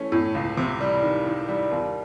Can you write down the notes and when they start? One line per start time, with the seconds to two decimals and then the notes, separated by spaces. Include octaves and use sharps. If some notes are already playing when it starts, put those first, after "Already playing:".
Already playing: E3 A3 C#4
0.12 A2
0.35 C#2
0.57 C3
0.80 G3
1.03 D#3
1.25 D#3
1.48 G3
1.71 D#2